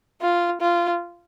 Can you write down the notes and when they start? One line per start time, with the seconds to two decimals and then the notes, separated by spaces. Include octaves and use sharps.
0.21 F4
0.61 F4